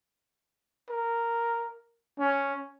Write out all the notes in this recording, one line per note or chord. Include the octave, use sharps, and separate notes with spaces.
A#4
C#4